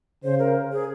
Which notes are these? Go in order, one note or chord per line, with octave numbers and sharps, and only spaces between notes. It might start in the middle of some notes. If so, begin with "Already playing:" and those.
C#3 C5
A#4
G#4